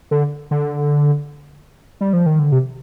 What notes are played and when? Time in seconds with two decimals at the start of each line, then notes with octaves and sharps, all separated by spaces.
0.11 D3
0.51 D3
2.01 G3
2.13 F3
2.26 D#3
2.39 D3
2.52 C3